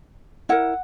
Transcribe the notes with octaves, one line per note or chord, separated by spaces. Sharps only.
E4 A#4 F#5